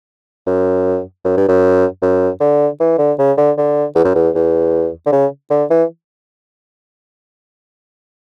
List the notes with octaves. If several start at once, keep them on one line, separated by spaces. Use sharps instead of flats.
F#2
F#2
G2
F#2
F#2
D3
E3
D3
C#3
D3
D3
E2
F#2
E2
E2
D3
C#3
D3
E3